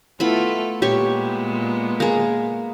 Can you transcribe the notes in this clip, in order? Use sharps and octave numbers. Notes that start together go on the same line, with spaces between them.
A3 B3 E4 F4 A4 B5
A#2 G#3 B3 G4 C#5 C#6
A#3 G#4